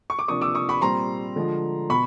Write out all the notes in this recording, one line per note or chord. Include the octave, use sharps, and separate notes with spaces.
C#6
D6
C3 F3 A#3 D4 C#6 D#6
D6 E6
C#6 D#6
B5 C#6
A#2 G3 C4 A#5 C6
D3 F3 G#3
B2 B5 C#6